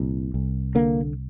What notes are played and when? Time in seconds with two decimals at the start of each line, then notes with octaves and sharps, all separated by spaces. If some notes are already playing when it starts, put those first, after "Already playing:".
Already playing: C2 A#2
0.34 C2
0.75 D3 A#3